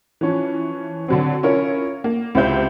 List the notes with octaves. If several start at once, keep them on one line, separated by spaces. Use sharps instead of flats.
E3 F3 C#4
D3 F#3 C4
C#4 E4 F4 A#4 C#5
A#3
C#2 C3 E4 C5 E5 G6